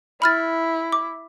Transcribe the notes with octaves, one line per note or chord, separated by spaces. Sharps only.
E4 B5 F6 A6
D6